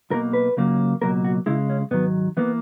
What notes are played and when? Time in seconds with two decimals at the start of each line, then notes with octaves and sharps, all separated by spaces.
0.11 B1 B2 A#3 A#4
0.33 B4
0.57 C#2 C#3 F#3 A#3
1.01 C#2 B2 F#3 A#3 A#4
1.25 F#4
1.46 C#2 C#3 G#3 E4
1.69 C#4
1.91 G#2 D#3 F#3 B3
2.37 E3 A#3 B3